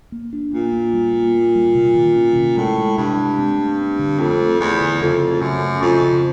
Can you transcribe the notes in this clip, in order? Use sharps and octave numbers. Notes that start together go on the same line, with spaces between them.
A#3
D4
A#2 A#3
A#3
G3
A#3
A#3
G3
C3
D#3
C#4
C3
A2 G#3
G#3
G2 C3
G#3
C4
A3
C4
D3
F2 A3
A3
E2 A3
D3
F2 C#3
A3
F#2 C#3
A3
F2 C#3
C#3